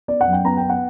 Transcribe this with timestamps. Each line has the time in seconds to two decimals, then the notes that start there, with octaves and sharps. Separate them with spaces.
0.08 B3 D5
0.21 F#5
0.27 F#2
0.33 G5
0.45 B3 A#5
0.57 G5
0.63 B3
0.70 F#5